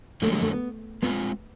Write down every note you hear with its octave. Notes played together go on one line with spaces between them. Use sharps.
F2 D3 F#3 A3 A#3
G#3
A3
B3
G#3 B3 C4 F4